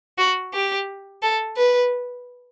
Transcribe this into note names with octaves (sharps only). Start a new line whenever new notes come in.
F#4
G4
A4
B4